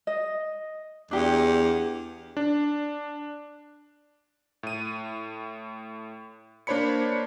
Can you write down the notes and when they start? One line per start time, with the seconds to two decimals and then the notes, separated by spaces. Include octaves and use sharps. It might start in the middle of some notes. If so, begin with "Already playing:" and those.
0.07 D#5
1.11 E2 D4 G4
2.37 D4
4.63 A2 D#7
6.67 A#3 D4 C5 C#5 B5 C#7